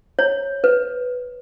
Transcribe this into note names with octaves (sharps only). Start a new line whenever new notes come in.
C#5
B4